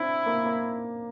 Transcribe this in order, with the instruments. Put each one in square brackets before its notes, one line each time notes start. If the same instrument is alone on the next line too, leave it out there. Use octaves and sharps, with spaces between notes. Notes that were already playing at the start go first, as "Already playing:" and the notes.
Already playing: [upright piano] C4 D4 [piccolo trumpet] E4
[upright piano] A#3
A#3